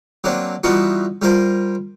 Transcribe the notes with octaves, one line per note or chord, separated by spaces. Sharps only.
F#3 A#3 C4 D4
E3 G3 B3 D#4 F4 F#4
G3 F4 A#4 C5